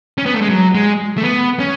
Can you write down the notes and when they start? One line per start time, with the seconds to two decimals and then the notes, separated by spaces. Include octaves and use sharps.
0.18 C#4
0.26 B3
0.34 A3
0.41 G#3
0.50 F#3
0.75 G#3
1.17 A3
1.23 B3
1.60 C#4